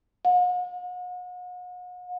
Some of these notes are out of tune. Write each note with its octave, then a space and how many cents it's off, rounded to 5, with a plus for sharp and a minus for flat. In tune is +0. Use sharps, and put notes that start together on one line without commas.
F#5 -40